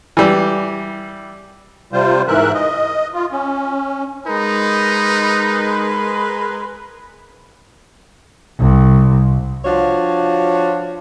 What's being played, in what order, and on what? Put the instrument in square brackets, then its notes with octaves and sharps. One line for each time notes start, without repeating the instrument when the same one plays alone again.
[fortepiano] E3 G3
[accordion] C3 G3 F4 C5
G#2 E3 A#4 E5 F#6
D#5
F4
C#4
[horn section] G#3 A#4 B4 [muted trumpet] D#4
[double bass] C2
[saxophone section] F3 D4 F4 F#4 C#5